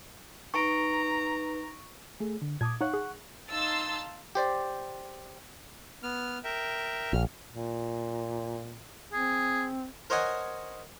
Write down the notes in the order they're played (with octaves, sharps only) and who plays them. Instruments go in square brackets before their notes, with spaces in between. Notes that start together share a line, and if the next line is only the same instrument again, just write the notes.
[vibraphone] D#4 B4 [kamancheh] A#5 [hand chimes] C#6 D7
[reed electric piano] A3 G#4
D3
[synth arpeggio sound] A#2 A5 [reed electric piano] D6 D#6 G#6
[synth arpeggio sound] D#4 C#5 F5 [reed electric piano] F#5 C#6 F#6
[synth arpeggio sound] G#4
[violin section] D#4 F5 A5 C6 E6 A6
[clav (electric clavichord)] G4 C5 D5
[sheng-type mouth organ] B3 F6
A#4 E5 G5
[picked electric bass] A#1 [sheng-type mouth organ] F6
[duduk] A#2
[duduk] C4 [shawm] G#4
[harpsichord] A#4 C5 C#5 D#5 F#5 G#5